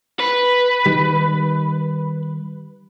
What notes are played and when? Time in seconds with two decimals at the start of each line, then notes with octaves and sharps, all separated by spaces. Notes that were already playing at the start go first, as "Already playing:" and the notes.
0.19 B4
0.86 D#3 G3